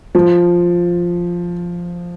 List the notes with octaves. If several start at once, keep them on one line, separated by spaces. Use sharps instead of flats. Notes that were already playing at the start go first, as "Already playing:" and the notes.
F3